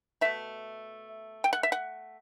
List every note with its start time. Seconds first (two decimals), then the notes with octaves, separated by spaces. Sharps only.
0.21 B2 A3 E5
1.44 G5
1.53 F#5
1.63 E5
1.72 F#5